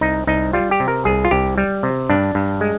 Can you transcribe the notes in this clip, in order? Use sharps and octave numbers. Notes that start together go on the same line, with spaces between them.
C2 D#4
C2 D#4
G3 F4
G4
C3
A#4
C2 G#4
F4
C2 G4
G3
C3
G2 D4
G2
G#3